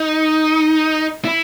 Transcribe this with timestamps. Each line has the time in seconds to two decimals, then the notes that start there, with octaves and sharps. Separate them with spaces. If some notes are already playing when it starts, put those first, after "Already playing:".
Already playing: D#4
1.25 E4